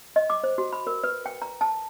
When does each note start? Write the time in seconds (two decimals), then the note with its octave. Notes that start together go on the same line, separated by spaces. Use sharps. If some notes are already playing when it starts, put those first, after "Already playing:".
0.16 D#5
0.30 D6
0.44 C5
0.58 F#4
0.73 B5
0.87 A#4
1.04 B4
1.26 G5
1.42 A#5
1.61 A5